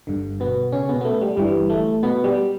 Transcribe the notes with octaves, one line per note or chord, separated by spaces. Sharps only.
G1 G2 D3
B2 B3
C#3 C#4
B2 B3
B3
A3
G3
G1 G2 E3 G3
A3
B2 B3
G3